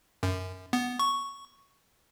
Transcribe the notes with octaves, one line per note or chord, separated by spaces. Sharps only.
F#2
B3
C#6